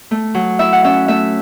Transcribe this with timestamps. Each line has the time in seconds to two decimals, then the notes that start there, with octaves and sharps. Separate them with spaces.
0.11 A3
0.35 F#3
0.59 E4 E5
0.73 F#5
0.84 C#4 E5
1.08 A3 E5